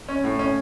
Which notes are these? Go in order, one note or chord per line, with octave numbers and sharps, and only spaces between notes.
C#4
A2
C#4